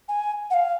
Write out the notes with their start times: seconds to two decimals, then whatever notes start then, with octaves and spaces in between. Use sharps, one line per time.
0.08 G#5
0.50 F#5
0.54 F5